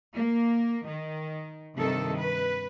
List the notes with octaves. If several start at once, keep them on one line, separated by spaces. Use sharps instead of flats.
A#3
D#3
G2 C3 D#3 A4
B4